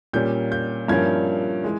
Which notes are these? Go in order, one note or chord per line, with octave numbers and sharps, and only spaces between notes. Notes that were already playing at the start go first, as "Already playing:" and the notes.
A#2 G3 A#3 C#4 G6
G6
G2 F3 A#3 C#4 E4 G#6
E3 G#3